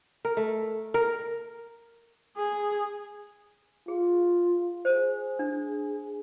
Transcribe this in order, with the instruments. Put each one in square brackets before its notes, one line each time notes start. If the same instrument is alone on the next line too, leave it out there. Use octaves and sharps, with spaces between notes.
[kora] A#4
A3
A#4
[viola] G#4
[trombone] F4 [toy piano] G#4
[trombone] G#4 [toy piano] C5
[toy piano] D4